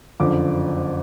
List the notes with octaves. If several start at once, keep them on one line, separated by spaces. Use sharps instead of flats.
F#1 F2 D3 F3 D6